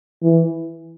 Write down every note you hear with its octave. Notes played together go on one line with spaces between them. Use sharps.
E3